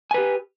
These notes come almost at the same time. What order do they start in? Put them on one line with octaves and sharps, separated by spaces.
G#5 B4 G4